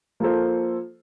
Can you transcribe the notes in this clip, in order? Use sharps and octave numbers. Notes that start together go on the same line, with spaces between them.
F3 A#3 F4 A4 C5